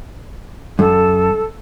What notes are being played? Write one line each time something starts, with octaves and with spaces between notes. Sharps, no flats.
F#2 A4